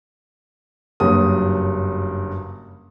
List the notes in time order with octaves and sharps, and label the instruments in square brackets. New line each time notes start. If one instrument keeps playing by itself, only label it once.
[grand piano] F#1 G2 F#3 D#6